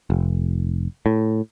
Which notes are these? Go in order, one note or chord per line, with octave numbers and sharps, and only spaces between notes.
F1
A2